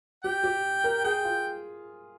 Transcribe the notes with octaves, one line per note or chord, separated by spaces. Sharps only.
G4 G5
G4
A#4
G#4 G5
F4